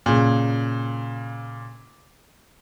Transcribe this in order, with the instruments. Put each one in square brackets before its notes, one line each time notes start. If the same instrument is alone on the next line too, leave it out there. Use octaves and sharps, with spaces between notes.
[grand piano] A#2 C#3